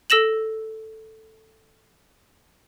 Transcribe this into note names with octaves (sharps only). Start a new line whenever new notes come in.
A4 E6 A#6 E7 F#7